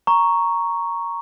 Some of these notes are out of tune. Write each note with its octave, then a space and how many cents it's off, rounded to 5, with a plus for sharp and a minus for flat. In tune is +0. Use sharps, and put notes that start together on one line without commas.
A#5 +0 C#6 +0